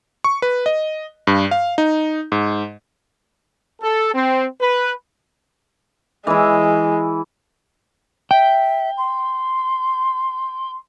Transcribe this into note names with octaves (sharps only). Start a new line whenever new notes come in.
C#6
B4
D#5
G2
F5
D#4
G#2
A4
C4
B4
E3 G#3 E4
E5 G5
C6